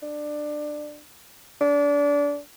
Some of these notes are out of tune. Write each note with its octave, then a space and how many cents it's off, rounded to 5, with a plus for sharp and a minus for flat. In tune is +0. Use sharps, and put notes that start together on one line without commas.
D4 +20
D4 -25